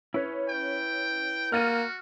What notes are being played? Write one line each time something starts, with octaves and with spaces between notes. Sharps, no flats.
C#4 E4 B4 C#5
G5
A#3 F#4 F6 A6 D#7